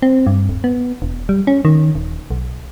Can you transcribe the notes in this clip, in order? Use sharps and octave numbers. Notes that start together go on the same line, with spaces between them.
C4
G2
D1
B3
E1
G3
C#4
D#3
D#1
B1